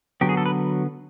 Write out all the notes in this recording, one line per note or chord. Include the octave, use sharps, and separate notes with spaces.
D3 F#3 B3 G4
G#4
A4
B4